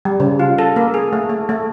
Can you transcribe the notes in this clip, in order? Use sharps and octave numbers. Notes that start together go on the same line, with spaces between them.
G3
C#3
F4
A4
A#3
G#4
A3
A3
A3